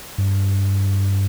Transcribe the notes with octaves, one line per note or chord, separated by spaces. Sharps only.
G2